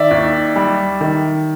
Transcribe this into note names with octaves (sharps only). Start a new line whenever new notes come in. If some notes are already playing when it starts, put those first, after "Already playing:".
Already playing: D#3 D5 E5
D#2
G3
D#3